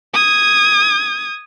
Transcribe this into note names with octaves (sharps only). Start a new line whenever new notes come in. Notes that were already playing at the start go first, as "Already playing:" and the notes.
D#6 G#6